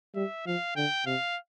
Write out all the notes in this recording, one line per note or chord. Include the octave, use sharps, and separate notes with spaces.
G3 E5
F3 F5
D3 G5
C3 F5